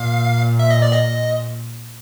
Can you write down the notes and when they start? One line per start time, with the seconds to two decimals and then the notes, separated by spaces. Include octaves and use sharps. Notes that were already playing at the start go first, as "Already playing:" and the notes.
Already playing: A#2 F5
0.59 E5
0.70 D#5
0.82 D5
0.93 D#5